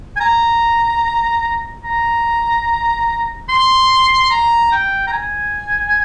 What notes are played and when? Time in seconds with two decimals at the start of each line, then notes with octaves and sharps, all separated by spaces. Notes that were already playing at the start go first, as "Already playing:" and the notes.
0.16 G#5
0.20 A#5
1.84 A#5
3.49 C6
4.20 C6
4.31 A#5
4.72 G5
5.07 A#5
5.12 G#5